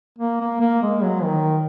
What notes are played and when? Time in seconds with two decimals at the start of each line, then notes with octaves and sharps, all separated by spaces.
0.19 A#3
0.40 A#3
0.60 A#3
0.82 G#3
1.03 F#3
1.24 D#3